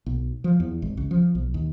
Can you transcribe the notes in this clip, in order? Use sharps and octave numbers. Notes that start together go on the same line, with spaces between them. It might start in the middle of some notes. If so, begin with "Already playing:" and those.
B1
F3
E2
G#1
C#2
F3
B1
D#2